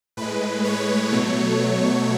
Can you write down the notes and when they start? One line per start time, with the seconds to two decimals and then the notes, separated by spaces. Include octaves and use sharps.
0.17 A2 G#3 B4
0.65 C#5
1.12 B2 F#3 A3